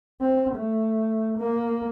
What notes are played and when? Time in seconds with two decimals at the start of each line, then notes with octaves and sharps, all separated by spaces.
0.21 C4
0.55 A3
1.38 A#3